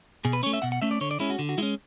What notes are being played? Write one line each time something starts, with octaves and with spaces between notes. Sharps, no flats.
B2 G#4
B4
A3 C#4 C#5
E5
B2 F#5
F#5
A3 C#4 E5
D5
D3 C#5
D5
G#3 C#4 E4
F#4
D3
F#4
G#3 C#4 E4